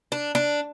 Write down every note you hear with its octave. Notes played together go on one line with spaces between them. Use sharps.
D4
D4